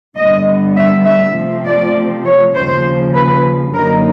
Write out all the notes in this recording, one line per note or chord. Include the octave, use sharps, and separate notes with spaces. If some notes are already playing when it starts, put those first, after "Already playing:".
G2 D3 G3 B3 D#5
E5
E5
C3 F3 A3 C4
D5
C#5
D#2 C#3 F3 C5
B4
F#2 D3 F#3 A#3 D#4 A#4